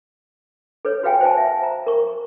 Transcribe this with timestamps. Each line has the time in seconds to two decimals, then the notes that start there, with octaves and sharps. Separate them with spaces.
0.85 A4 B4 C#5
1.03 F#4 B4 C#5 F5 G5 G#5
1.21 C5 F5 G#5 A5
1.37 E5
1.63 A#5
1.87 A#4 C#6